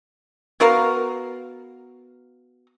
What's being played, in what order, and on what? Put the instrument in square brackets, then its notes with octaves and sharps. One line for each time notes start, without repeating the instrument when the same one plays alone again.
[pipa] B3 F#4 A#4 F5